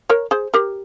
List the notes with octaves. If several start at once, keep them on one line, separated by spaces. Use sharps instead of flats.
A#4 C#5
G#4 C5
G4 A#4